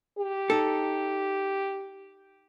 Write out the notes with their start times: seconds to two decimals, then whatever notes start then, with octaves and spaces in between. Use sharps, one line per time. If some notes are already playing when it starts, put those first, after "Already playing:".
0.18 G4
0.50 D#4 A4